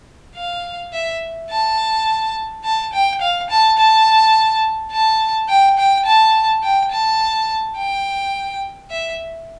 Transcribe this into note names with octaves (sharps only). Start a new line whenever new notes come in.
F5
E5
A5
A5
G5
F5
A5
A5
A5
G5
G5
A5
G5
A5
G5
E5